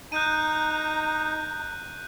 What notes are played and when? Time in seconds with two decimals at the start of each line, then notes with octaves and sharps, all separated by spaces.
0.12 D#4 A#5 F#6 G6 D#7